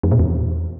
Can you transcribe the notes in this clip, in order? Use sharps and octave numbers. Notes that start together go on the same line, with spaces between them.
F2
A#2
E2